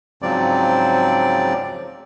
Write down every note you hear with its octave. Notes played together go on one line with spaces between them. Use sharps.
G#2 C#3 F3 F#3 C4 D5